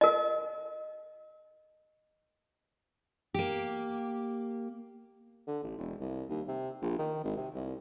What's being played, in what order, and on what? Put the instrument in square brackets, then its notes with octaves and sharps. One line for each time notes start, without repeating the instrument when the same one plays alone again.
[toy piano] A#4 D#5
[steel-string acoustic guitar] A#3 G4
[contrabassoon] D3
A1
E1
C2
D#2
C3
A#1
D#3
G#1
C3
C2